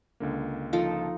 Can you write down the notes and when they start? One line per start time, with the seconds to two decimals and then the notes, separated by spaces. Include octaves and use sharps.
0.20 C#2 D3 A#3
0.73 F3 D#4 A4